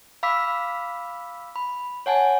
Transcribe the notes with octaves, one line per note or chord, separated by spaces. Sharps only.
F5 B5 D6 E6 B6
B5
C#5 F#5 G#5 A5